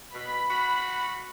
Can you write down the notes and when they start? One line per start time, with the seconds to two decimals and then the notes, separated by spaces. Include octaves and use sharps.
0.14 B2 B5
0.50 F#4